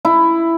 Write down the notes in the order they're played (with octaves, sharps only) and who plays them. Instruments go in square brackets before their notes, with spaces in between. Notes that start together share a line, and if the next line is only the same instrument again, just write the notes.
[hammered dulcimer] E4